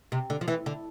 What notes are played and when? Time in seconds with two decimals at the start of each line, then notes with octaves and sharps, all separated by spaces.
0.12 C3
0.30 D3
0.41 F3
0.48 E3
0.66 D3